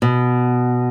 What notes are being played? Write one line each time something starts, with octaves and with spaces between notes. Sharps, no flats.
B2